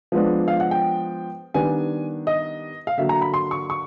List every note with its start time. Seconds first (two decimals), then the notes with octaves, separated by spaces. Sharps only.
0.12 F3 G#3 B3 D4
0.48 F5
0.60 F#5
0.71 G5
1.54 D#3 G3 B3 D4 G#5
2.27 D#5
2.87 F5
2.98 D3 F#3 A#3 E5
3.09 A#5
3.21 B5
3.34 C6
3.51 C#6
3.70 C#6